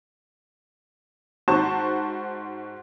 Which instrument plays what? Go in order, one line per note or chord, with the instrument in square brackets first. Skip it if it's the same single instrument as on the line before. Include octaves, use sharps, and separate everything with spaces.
[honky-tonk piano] G#2 F#4 C5 A5 C#6 E7